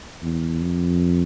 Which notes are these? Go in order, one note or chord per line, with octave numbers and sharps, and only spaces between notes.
E2
F2